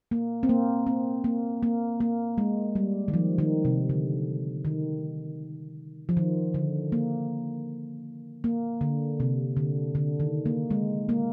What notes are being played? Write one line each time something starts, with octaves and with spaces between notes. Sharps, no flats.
A#3
C4
A#3
C4
A#3
A#3
A#3
G#3
G3
D#3
F3
D#3
C3
D3
D#3
F3
D#3
D3
A#3
A#3
D3
C3
D3
D3
D#3
A#3
G#3
A#3